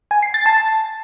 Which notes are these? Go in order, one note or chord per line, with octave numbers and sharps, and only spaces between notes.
G#5
C7
A6
A5